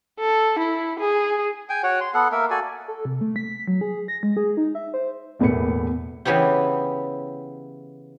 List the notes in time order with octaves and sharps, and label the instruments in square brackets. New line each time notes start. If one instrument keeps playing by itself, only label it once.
[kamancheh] A4
E4
G#4
[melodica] G5 G#5
F#4 C#5 F#5
C6
B3 A4 F#5
A#3 A#4 E5
F#4 A4 D5 G#5
[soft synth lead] A4
C3
A3
B6
F#3
G#4
A#6
G#3
G#4
D#4
E5
C5
[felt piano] E1 E2 A2 A#3 B4 C#7
[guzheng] C#3 E3 B3 E4 G4